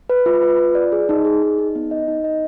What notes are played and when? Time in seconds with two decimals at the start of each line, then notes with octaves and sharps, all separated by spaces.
0.10 B4
0.26 F4
0.43 B4
0.59 F4
0.75 D5
0.92 G#4
1.09 D#4
1.25 G#4
1.42 D#4
1.58 D#4
1.75 B3
1.91 D#5
2.08 D#4
2.24 D#5